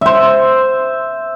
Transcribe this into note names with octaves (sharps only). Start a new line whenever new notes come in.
C5 E5